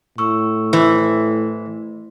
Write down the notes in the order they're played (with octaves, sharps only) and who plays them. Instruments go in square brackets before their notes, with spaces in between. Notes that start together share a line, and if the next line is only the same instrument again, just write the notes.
[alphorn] A2 [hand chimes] C#6 E6
[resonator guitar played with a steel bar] E3 [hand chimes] A3 C5